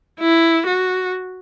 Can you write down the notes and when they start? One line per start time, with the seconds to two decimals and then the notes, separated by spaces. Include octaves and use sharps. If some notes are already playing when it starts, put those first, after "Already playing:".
0.20 E4
0.66 F#4